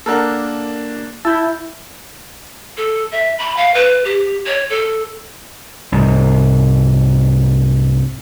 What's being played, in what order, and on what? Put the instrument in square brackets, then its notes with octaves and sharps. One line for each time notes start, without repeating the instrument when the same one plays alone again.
[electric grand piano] A#3 D4 [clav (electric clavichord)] A4 A#4 F#5
[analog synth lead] E4 [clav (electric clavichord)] A5 [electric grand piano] E6 G6
[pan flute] A4
E5
B5
F5
B4
G4
C#5
A4
[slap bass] C2 G#2